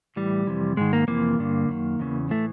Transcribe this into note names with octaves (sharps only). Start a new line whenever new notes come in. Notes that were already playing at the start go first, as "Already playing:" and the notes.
A2 E3 G3
F2 C3 E3
G#2 D#3 G#3
A#3
F2 C3 E3 A#3
G2 D3
F#2 D#3
E2 C#3 E3
A2 E3 A3